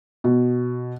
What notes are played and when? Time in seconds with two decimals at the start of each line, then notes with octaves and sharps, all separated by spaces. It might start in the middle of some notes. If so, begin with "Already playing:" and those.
0.24 B2